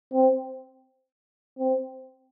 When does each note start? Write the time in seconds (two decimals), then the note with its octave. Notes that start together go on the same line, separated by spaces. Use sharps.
0.13 C4
1.59 C4